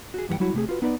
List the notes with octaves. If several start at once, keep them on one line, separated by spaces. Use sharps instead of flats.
F#4 G#4
G2 E3 G3 F#4 F#5 G5
F#3 G3 E4 F#4
C3 A3 G#4
F4 F#4 B4
B3 D#4 B4 D5 B5